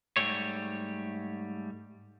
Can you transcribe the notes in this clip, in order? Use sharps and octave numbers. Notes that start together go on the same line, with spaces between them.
G#2 G3 A3 C#5